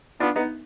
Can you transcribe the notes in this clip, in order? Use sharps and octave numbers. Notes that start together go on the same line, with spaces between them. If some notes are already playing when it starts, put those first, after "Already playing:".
B3 D4 F4
B3 D#4